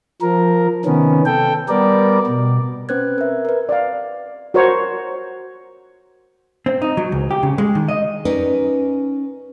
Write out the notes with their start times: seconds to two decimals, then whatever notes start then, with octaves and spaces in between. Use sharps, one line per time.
0.22 F3 A#4
0.85 C3 D#3 B3 C#4
1.26 A4 G5
1.69 G3 B3 A#4 D5
2.27 B2
2.89 C4 C#4 B4 C5 F#6 G#6
3.18 A#4 E5
3.45 A#4 B4
3.69 D5 F5
4.54 F#4 A#4 C5 C#5 F#5
6.66 C4
6.82 D#4
6.97 F#3
7.12 C#2
7.31 G4
7.43 C#3
7.58 G#3
7.75 D#3
7.88 D#5
8.25 C#4 D#4 A#4 B4 D5